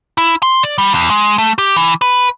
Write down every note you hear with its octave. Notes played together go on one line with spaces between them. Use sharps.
E4
C6
D5
G3
E2
G#3
A3
G4
E3
B4